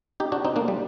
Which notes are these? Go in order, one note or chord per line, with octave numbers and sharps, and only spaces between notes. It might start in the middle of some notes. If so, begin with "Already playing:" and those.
D#4 G4
D4 F#4
C4 D#4
A#3 D4
G3